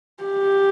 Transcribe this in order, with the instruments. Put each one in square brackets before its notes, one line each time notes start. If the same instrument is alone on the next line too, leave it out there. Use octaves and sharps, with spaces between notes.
[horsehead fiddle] G4